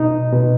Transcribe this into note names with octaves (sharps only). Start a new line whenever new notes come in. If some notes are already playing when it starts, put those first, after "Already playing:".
Already playing: B2 D#4
B2